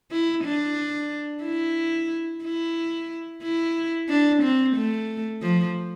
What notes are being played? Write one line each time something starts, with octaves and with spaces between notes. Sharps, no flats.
E4
D4
E4
E4
E4
D4
C4
A3
F3